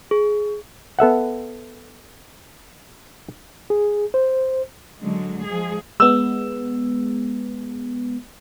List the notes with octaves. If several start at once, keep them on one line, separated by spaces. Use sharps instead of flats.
G#4
B3 A4 E5 F#5
G#4
C5
D3 F#3 G#3
F3 G#3 G#4
G#3 B3 E6